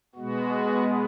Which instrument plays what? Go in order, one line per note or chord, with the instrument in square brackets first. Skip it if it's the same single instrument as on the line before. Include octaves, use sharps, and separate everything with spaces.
[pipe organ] B2 G#3 B3 F#4